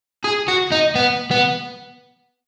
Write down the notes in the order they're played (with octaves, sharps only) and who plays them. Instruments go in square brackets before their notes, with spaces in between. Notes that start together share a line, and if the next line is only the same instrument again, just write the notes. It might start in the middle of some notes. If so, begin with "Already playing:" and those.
[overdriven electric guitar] G#4
F#4
D#4
B3
B3